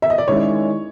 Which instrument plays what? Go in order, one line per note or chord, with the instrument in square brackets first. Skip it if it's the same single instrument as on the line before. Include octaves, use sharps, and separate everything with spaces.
[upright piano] E5
D#5
D5
[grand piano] D#3 G#3 C#4 E4 [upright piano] C#5